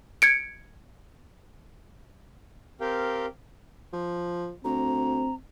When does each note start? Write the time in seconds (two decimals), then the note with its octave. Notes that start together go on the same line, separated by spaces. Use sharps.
0.22 G#6 C#7 D7
2.81 C4 G4 A#4 F5 G5
3.93 F3
4.64 D2 C4 A#5